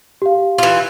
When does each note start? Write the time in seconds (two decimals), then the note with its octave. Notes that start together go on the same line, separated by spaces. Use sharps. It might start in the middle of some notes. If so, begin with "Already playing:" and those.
0.22 G4 F5
0.58 E3 F4